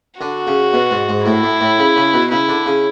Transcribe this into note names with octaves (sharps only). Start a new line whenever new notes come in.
D3 F#4
C#3
B2
G#2
G#2
A2 E4
A2
A2
C#3
C#3
B2
C#3 E4
D3
C#3